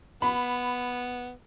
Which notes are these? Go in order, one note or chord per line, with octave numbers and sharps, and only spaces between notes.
B3 B5